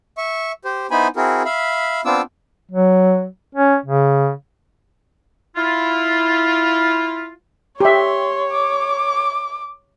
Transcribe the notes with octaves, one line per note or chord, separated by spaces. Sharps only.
E5 C#6
G4 C5
B3 D#4 E4 C5 G#5 B5
C4 E4 F#4 G#4 A#4
E5 F5 B5
B3 C4 D4 F4 D6 E6
F#3
C#4
C#3
E4 F4
G4 C#5 E5 C6
D6